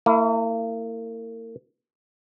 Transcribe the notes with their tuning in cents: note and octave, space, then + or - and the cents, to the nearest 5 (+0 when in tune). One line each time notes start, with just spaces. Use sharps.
A#3 -40 E4 +5